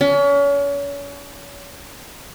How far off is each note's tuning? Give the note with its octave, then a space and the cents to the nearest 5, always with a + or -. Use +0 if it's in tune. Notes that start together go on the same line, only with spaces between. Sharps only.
C#4 +35